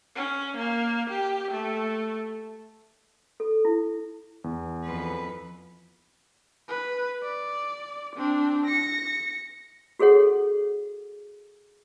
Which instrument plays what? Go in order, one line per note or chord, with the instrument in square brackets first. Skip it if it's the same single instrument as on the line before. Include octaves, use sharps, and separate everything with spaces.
[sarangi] C#4
A#3
G4
A3
[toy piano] A4
E4
[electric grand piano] E2
[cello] F2 B4
[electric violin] B4
D5
C4 D4
A#6 C#7
[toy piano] F#4 G#4 A4 C#5 F#5